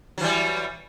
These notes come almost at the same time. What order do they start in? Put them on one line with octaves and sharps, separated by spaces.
F#3 E3 G3